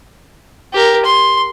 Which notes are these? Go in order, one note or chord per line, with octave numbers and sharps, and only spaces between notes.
G4 A#4
C6